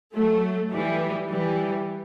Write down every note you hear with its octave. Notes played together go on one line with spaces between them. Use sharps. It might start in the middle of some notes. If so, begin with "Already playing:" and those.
F#3 A3
E3 G3
E3 G3